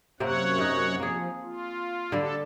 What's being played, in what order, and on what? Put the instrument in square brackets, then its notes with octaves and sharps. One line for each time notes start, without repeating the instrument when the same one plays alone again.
[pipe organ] F#2 C#5 F#5 [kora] C3 A#3 C4
[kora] C3 D#4
[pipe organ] F3 [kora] A#3 G#4
[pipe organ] F4
[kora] D3 G3 [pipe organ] D4 A4